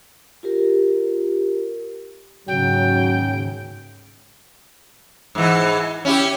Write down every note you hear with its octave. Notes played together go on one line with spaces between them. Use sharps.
F4 G4 A#4
D#2 G#2 C#3 F#3 G5
G#2 E3
C#4 E4 G4